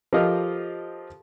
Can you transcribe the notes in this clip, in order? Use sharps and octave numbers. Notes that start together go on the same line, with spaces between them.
F3 G4 A4 A#4 D#5 F5